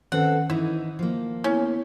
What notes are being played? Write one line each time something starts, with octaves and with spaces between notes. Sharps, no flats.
D#3 C4 C#4 A4 B4 F#5
E3 D#4 E4
F3 A#3
B3 C#4 E4